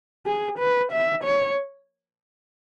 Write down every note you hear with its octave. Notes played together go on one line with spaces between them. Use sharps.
G#4
B4
E5
C#5